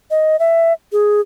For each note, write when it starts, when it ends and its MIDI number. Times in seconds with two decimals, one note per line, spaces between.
0.11 0.39 75
0.39 0.73 76
0.92 1.21 68